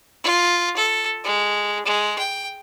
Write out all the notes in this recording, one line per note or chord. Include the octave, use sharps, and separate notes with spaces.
F4
A4
G#3
G#3
G5